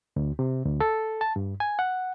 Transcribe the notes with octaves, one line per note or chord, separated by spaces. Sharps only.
D2
C3
D2
A4
A5
G2
G#5
F#5